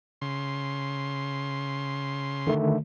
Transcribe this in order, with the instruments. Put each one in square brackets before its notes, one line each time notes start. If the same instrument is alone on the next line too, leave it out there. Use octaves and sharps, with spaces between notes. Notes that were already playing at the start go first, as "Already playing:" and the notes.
[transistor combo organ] C#3 C6
[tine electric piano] D3 D#3 A3